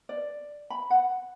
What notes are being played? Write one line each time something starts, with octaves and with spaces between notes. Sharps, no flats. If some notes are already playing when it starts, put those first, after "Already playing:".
D5
B5
F#5